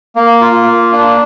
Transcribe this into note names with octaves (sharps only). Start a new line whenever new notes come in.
A#3
F4
A#3
D4